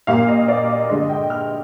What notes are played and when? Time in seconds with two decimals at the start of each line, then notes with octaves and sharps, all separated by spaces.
0.07 A#2 G3 A#3 F5
0.28 D#5
0.48 D5
0.69 D#5
0.90 G2 D3 G#3 D#5
1.10 G5
1.30 F6